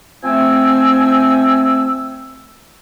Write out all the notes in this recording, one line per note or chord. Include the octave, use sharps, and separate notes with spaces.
F3 A3 C4 G#5 E6